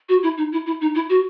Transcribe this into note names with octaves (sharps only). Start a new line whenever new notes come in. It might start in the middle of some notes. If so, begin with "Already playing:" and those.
F#4
E4
D#4
E4
E4
D#4
E4
F#4